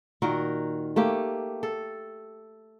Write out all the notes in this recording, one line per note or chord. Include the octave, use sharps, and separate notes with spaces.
A#2 D#3 F#4 A#4
A3 A#3 G4
A4